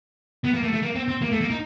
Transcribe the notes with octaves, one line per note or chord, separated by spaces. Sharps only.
B3
A#3
A3
A3
A#3
C4
C4
A#3
A3
A#3
D#4